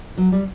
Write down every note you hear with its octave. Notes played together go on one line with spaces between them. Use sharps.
F#3
G3